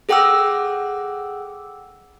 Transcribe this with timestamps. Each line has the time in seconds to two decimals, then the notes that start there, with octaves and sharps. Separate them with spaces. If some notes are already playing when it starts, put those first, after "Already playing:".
0.09 G#4 A4 F#5 G5 D6 E6